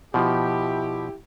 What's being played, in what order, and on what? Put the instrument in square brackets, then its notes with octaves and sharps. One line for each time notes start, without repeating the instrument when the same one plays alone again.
[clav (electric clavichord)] B2 F3 [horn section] E4 G4